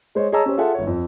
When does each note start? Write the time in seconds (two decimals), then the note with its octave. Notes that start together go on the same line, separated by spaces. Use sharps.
0.15 G#3 C5 C#5 D#5
0.32 G#4 C#5 D#5 A5 A#5 E6
0.45 C#4 G4 C5
0.57 F4 G#4 A4 E5 F#5
0.74 G1 C#5
0.87 F2